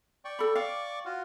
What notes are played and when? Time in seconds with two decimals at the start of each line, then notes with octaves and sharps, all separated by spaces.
0.25 D5 G5 C#6
0.39 A4 B5
0.55 D5 F5 G5 C#6 D6
1.05 F4 F#4